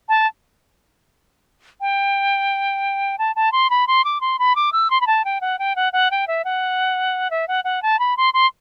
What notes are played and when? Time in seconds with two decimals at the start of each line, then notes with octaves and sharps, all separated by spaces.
0.09 A5
1.81 G5
3.19 A5
3.36 A5
3.52 C6
3.70 B5
3.87 C6
4.05 D6
4.21 C6
4.39 B5
4.56 D6
4.73 E6
4.91 C6
5.01 B5
5.07 A5
5.25 G5
5.41 F#5
5.59 G5
5.76 F#5
5.93 F#5
6.11 G5
6.28 E5
6.45 F#5
7.31 E5
7.48 F#5
7.64 F#5
7.83 A5
7.99 B5
8.17 C6
8.34 C6